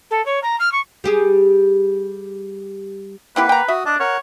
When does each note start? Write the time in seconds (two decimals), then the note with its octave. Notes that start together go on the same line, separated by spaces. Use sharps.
0.10 A4
0.25 C#5
0.42 A#5
0.59 F6
0.71 C#6
1.04 G3 G4 G#4
3.36 A#3 C4 E4 G4 B4 F#5
3.49 G5 A#5
3.68 F#4 E5 D#6
3.86 D4 D#5 A5 D6
4.00 A#4 C#5 F#5